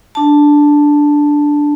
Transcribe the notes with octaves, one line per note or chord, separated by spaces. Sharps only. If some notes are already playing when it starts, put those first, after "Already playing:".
D4 A5